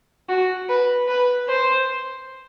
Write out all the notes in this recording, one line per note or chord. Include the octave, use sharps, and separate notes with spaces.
F#4
B4
B4
C5